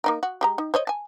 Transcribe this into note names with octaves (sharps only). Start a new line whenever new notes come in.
A#3 D#4 A#4
F#4
G#3 G4 A#5
D#4
C5 C#5 D#5
G#5 A5